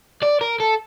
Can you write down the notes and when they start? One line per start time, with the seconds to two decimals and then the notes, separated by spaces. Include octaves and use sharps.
0.22 D5
0.41 A#4
0.60 A4